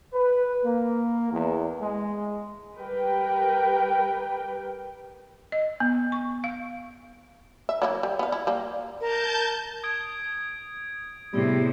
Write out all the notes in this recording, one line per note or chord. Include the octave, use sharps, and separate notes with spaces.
B4
A#3
E2
G#3
G3 G4 A#4 B4 G5
D#5
B3
C#6
F5
E5
F#3 A#3 E4
G3
B3 F5
E4
G3 A#3
A#4 A5 G6
D#6 G#6 D7
A2 C3 G3 B3 E4 G#4